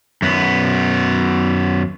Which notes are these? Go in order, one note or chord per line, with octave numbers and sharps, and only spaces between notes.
F#2 B3